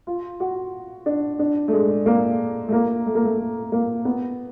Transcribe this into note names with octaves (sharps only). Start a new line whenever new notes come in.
F4
F#4
D4
D4
A3
G#3
A#3
A3
A#3
A3
A#3
A3
A3
A#3
B3